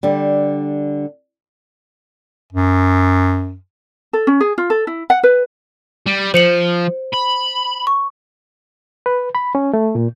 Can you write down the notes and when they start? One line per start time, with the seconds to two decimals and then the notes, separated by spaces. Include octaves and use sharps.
0.03 D3 G3 D4
2.53 F#2
4.13 A4
4.27 C#4
4.41 G#4
4.58 F4
4.70 A4
4.87 E4
5.10 F#5
5.23 B4
6.07 G3
6.34 F3 C5 C#7 F#7
7.14 B5
7.87 C#6
9.06 B4
9.35 B5
9.55 C#4
9.74 A3
9.95 A#2